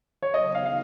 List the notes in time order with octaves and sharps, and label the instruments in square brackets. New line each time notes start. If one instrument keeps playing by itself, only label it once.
[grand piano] C#5
[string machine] C#3 F#3 B3 D#4 [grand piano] D#5
[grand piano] F5
F5